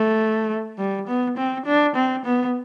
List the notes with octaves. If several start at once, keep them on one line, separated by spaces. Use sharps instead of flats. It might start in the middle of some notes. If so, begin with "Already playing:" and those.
Already playing: A3
G3
B3
C4
D4
C4
B3